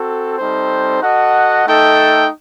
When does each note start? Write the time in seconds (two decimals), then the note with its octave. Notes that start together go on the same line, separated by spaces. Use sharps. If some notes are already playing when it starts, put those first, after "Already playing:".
Already playing: C4 F#4 A4
0.39 G3 C4 D#4 A4 C5
1.02 F#4 A4 D#5 F#5
1.66 A3 D#4 A4 D#5 G5